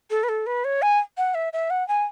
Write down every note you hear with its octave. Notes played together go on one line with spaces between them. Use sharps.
A4
B4
A4
B4
C#5
G#5
F#5
E5
E5
F#5
G#5